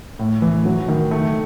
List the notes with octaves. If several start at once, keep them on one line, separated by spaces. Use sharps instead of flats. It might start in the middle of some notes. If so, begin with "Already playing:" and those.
A2
E3
F#3
D#3
A3